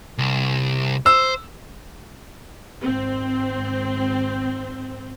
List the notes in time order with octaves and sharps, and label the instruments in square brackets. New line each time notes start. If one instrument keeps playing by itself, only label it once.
[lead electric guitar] C2
[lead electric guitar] C5 [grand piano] E6
[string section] G#1 C4